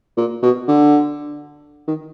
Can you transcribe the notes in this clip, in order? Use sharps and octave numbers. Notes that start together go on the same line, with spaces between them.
A#2
B2
D3
D#3